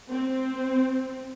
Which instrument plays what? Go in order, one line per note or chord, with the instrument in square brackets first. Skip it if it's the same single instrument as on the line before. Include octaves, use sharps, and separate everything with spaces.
[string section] C4